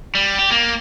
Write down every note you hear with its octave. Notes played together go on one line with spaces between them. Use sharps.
G3
G4
A#3